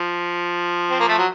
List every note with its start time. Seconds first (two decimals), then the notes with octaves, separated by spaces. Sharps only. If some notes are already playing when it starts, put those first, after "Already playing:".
Already playing: F3
0.90 C4
1.00 A#3
1.08 A3
1.18 F#3